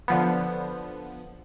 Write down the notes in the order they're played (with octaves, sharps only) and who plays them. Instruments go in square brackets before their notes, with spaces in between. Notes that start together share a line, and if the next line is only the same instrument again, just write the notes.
[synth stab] D3 F3 B3